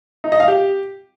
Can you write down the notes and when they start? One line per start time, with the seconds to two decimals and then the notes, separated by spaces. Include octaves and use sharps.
0.24 D#4
0.32 D#5
0.40 F5
0.48 G4